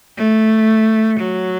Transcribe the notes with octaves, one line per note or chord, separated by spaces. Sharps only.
A3
F#3